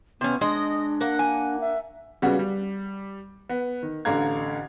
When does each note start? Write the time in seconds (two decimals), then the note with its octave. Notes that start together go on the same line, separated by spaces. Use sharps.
0.21 C3 B3 C#4
0.41 G#3 D4 D#5
1.01 A#3 F#5
1.19 G#5
1.60 E5
2.22 C#3 G3 B3 F#4
2.39 G3
3.49 B3
3.83 D#3
4.05 A1 D3 F5 A#5 G#6